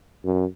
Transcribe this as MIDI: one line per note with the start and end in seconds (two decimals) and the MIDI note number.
0.25 0.45 42